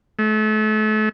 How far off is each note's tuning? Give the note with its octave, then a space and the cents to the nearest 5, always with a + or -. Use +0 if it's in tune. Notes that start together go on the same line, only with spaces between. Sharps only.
A3 -35